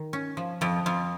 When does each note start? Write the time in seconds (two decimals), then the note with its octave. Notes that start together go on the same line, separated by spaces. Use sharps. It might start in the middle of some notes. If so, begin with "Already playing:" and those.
Already playing: D#3
0.13 C#4
0.37 F3
0.61 F2 F3
0.86 F2 F4